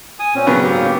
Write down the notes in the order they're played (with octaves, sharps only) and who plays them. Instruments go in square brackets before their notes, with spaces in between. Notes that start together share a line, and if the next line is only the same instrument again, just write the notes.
[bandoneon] G#5 D#6
A#2 C4 C#4
[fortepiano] C#3 F#3 B3
[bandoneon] G#2 A#3 G4